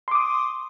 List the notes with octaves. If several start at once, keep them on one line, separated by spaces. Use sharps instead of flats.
C6 D6 D#6